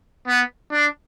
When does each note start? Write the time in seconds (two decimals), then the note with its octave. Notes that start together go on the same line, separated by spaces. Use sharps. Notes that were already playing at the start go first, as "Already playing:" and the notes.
0.28 B3
0.72 D4